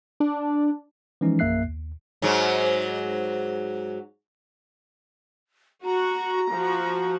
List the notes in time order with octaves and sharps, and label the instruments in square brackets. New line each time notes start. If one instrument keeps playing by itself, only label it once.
[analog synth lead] D4
[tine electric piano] E3 F3 G#3 C#4 D#4
A#1 F#2 A#3 E5 F#6 C7
D#2
[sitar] G#2 F#3
[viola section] F#4 [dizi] A#5
[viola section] F3 F#4